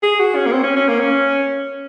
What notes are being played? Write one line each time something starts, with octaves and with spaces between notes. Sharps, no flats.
G#4
F#4
C#4
A#3
C4
C#4
C#4
A#3
C#4